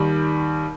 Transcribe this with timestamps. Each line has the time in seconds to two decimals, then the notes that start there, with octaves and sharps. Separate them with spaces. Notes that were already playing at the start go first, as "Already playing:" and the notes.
Already playing: D#2 D#3 G3